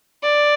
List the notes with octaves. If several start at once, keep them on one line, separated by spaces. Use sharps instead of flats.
D5